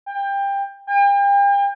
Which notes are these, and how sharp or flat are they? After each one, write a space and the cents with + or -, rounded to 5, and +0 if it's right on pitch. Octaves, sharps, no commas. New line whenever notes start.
G5 +20
G5 +40